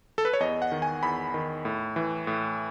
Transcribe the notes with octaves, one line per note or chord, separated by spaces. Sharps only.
A4
B4
C#5
E2 D#5
F#5
D#3
G#5
E2 B5
D#3
A2
E3
A2